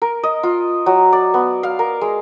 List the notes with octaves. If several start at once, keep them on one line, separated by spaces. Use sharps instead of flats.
A#4
D#5
F4
F#3
D5
B3
F5
A#4
G#3